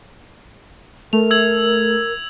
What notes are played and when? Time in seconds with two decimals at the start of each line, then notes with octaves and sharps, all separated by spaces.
1.13 A3 A#4 F7
1.31 E6 G#6 F#7